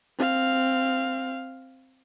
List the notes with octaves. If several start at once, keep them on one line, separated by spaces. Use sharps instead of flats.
C4 F5